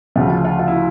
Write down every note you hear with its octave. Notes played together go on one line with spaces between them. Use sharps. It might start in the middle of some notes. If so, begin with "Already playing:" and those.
D2 C#3 F3 F4
F4
F4
F4
E4